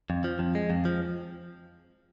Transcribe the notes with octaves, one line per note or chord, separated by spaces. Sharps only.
F2
F3
F2
G#3
F2
F3